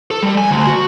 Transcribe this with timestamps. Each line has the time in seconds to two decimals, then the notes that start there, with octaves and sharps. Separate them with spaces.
0.11 A4
0.23 G3
0.38 G#5
0.50 D2
0.67 F#4